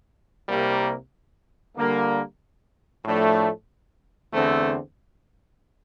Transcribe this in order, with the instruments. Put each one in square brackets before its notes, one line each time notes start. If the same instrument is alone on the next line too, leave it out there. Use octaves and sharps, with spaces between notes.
[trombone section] C2 C3 G3 A#3
D3 G3 A#3
A2 F3 A3 D4
E2 D3 A3 C4